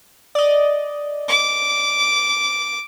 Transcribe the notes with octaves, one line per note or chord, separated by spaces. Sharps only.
D5 D#5
D6